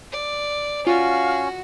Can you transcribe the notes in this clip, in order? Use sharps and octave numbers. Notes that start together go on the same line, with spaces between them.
D5
C#4 F4 F#4 F5